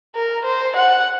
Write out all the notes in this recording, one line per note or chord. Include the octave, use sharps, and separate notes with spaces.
A#4
C5
F#5